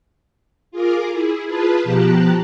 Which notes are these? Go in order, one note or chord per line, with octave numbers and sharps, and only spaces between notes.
F4 G#4 A#4 D6
E4 G#4
F4 G#4 B4 A5 B5
B2 F3 G4 A5 A#5 F#6